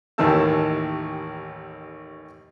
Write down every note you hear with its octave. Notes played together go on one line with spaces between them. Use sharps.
A1 D#2 D#3 E3 A5 E6